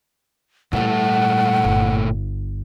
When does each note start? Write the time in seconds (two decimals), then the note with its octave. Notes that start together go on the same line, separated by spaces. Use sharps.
0.73 A#2 E3 G3 A3 A4 F#5
1.64 G1